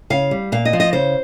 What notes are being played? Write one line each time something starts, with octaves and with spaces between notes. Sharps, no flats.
C#3 F5
G3
A#2 F5
D#5
F3
D#5
C#3 C5